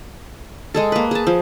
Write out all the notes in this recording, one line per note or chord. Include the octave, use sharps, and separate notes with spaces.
G#3 G#4 A4
A#3 B4
G#4 A5
F3